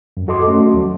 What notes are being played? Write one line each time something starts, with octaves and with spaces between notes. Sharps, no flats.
F#2
F#4 A4 D#5 C6 D6
A3 C#4 F#4
D#2 F#3